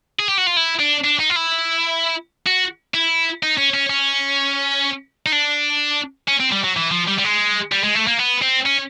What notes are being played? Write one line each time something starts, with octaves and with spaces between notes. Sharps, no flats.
G#4
G4
F#4
F4
E4
D4
D4
D#4
F4
E4
F#4
E4
D#4
C#4
C#4
C#4
D#4
D4
C#4
C4
G3
F#3
E3
F3
G3
G3
G#3
G3
G#3
A3
A#3
B3
C4
C#4